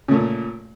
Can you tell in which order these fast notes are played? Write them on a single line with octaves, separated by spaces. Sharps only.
C#3 A3 A#2